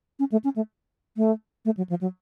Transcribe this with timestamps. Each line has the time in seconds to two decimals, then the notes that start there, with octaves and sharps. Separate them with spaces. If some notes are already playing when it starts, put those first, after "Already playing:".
0.19 C#4
0.32 A3
0.44 C#4
0.56 A3
1.17 A3
1.65 A3
1.77 F#3
1.89 F3
2.01 F#3